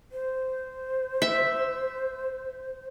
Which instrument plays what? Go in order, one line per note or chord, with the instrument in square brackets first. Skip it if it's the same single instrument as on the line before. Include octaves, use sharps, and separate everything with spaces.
[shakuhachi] C5
[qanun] E5